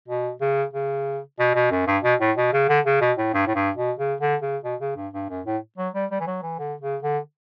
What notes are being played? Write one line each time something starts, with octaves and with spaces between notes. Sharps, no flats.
B2
C#3
C#3
B2
B2
F#2
G2
B2
A2
B2
C#3
D3
C#3
B2
A2
G2
A2
G2
B2
C#3
D3
C#3
B2
C#3
G2
G2
F#2
A2
F#3
G3
G3
E3
F#3
E3
D3
C#3
D3